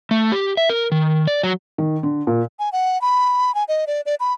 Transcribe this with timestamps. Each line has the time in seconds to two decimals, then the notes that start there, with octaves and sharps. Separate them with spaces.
0.11 A3
0.32 G4
0.57 E5
0.69 A#4
0.92 D#3
1.27 D5
1.43 F#3
1.78 D#3
2.03 D3
2.27 A#2
2.59 G#5
2.72 F#5
3.01 B5
3.55 G#5
3.68 D#5
3.87 D5
4.06 D5
4.20 B5